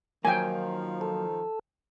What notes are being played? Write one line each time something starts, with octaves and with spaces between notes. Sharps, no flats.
D#3 F3 F#3 A#3 G5 G#5
A4